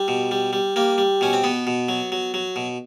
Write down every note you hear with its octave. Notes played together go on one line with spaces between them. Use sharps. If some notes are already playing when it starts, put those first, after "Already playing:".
Already playing: G3
B2
G3
G3
G3 A#3
G3
B2 C#4
C4
B2 B3
B2
F#3
F#3
F#3
B2